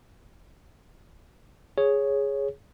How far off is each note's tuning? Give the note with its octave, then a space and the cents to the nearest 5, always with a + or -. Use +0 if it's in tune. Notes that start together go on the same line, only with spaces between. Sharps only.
G#4 +0 C#5 +0